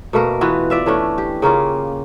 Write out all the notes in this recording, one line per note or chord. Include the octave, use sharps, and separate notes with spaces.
B2 A3 A#3 A#4
E3 B3 F4 F#4
F4 D5 E5 F5
E3 A3 C#4 D4
G4
C#3 A#3 C#4 F4